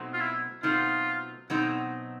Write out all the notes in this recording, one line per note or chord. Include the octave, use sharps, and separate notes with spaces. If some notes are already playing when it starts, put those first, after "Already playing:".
Already playing: B2 F#3 A3 C4 D#4
F4
E4
B2 F#3 A3 C4 D#4 F4
B2 F#3 A3 C4 D#4